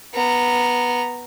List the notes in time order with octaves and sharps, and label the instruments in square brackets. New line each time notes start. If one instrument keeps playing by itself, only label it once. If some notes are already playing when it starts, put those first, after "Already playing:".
[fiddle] B3 A#5